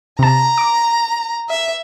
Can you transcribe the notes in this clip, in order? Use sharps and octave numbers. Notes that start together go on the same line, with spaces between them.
C3 A5 A#5
D6
E5